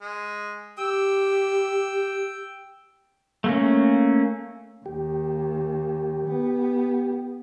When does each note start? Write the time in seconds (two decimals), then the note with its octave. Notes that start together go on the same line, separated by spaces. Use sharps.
0.01 G#3
0.78 G4 G5 E6
3.44 A3 A#3 C#4
4.86 D#2 G4
6.27 B3